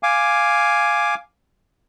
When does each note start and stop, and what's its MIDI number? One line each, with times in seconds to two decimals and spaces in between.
0.03 1.15 77
0.03 1.15 80
0.03 1.15 86